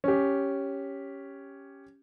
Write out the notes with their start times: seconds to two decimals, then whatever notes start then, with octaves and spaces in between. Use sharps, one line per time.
0.04 C#4 G4